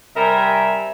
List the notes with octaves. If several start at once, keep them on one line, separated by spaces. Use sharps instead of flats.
C3 G3 C4 A#4 E5 G#5